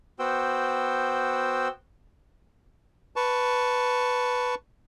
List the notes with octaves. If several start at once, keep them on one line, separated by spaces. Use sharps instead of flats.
B3 F#4 C5 G5 E6
B4 A5 C#6